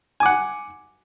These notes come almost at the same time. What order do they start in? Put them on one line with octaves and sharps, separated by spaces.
G#5 D6 F#5